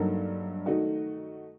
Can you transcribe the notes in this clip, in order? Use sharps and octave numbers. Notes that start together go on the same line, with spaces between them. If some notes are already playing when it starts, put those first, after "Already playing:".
Already playing: G2 F#3 A#3 D#4 A4
D#3 A3 D#4 F#4